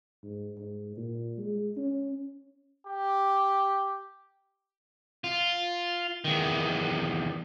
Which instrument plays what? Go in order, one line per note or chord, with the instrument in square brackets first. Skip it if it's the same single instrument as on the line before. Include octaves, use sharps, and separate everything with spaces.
[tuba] G#2
G#2
A#2
G#3
C#4
[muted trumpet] G4
[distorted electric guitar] F4
E2 D#3